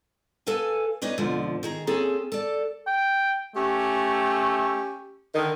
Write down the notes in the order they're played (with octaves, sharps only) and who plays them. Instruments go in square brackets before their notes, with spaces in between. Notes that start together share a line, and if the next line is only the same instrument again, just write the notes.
[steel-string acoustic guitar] A4 B4 F5 G#5
C#4 D#4 B4 D5
F2 G#2 B2 D3 F3
D#3 G#4 A#5
A#3 C4 C#4 G#4 A4
A4 D5
[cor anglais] G5
[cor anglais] A3 [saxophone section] C#4 G4
[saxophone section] D3 D#3